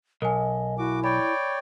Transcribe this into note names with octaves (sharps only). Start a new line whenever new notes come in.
B1 A#4 D#5 G#5
E4 F#4 D6
C#5 D5 G5 B5